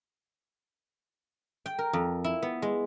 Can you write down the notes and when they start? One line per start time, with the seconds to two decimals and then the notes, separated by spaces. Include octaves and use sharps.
1.66 G5
1.79 A#4
1.93 F2
2.24 E4
2.42 B3
2.62 G#3